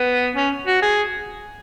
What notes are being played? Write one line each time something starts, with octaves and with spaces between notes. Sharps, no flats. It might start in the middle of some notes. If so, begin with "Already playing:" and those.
Already playing: B3
C#4
F#4
G#4